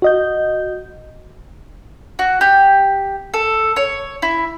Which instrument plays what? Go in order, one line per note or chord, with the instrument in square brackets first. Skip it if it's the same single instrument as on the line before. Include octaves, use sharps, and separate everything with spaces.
[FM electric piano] F#4 D#5 G6
[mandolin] F#4
G4
A4
C#5
E4